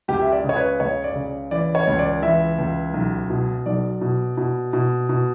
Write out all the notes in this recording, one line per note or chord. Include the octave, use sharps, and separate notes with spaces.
C#2 G4
E5
D5
C#3 C#5
B4
C#2 C#5
D5
C#3
E3 D5
C#5
C#2
D5
E3 E5
C#2
B1
B2
B1 D5
B2
B2
B2
B2